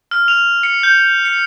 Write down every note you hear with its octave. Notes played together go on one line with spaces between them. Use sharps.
F6
F7
C#7
G6
C#7